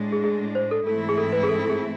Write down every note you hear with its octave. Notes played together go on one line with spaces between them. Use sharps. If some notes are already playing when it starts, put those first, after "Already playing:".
Already playing: A2 G#3 D4
G#4
G#4
C5
A4
G#2 E3 A3 C4 E4 A4
G#4
A4
B4
G#4
A4
A4
G#4